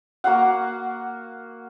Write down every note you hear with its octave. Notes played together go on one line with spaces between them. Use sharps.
A#3 F#4 F5 F#5